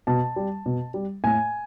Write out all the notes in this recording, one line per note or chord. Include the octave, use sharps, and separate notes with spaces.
B2 A5
G3
B2
G3
A2 G#5